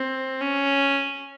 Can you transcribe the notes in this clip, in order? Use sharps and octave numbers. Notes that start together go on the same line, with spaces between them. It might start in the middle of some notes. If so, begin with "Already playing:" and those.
Already playing: C4
C#4